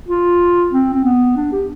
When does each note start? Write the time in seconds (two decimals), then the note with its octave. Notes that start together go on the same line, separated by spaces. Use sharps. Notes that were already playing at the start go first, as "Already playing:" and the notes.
0.09 F4
0.73 C4
0.94 C4
1.05 B3
1.37 D4
1.52 G4